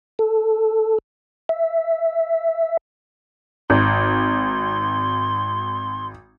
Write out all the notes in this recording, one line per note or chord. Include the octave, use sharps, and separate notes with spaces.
A4
E5
G#1 C6